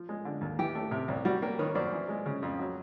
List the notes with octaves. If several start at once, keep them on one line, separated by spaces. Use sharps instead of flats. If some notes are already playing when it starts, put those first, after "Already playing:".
Already playing: F3
G#3
D3
D#2
E3 G4
A3
C3
C2
G3 F#4
A#3 G4
D#3 B4 C#5
F#2 C5 D5
E3
G#3
C#3
F2
F#3